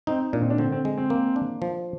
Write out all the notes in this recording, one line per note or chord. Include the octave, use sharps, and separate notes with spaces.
C4 D#4
A#2 D4
C4
D4
D3 C4
C4
G#3
C4
A#3
D4
F3